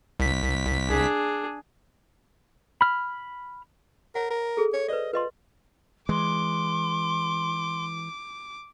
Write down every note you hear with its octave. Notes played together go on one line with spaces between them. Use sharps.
C2 B6
D4 G#4
B5 F6
A#4 C#5 F#5
A#4
G#4 A4
C#5
B4 C5 D5 D#5
F4 B4 D#5 C6
E3 G#3 C6 D6